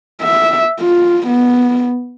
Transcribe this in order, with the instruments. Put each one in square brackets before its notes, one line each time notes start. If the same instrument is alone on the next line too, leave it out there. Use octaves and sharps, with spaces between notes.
[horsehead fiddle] E5
F4
B3